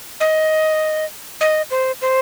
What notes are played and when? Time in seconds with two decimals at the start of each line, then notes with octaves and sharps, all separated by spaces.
0.20 D#5
1.41 D#5
1.71 C5
2.02 C5